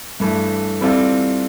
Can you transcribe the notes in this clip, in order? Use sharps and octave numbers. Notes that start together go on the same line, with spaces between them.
G2 E3 A3
E3 G3 C4 F4 A4